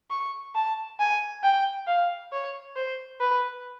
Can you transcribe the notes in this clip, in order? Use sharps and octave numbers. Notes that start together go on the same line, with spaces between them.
C#6
A5
G#5
G5
F5
C#5
C5
B4